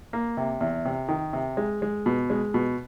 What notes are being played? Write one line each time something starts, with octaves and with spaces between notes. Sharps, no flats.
A#3
C3
E2
C3
D#3
C3
G#3
G#3
B2
G#3
B2